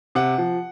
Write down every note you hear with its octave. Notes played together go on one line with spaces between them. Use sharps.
C3 F#5
F3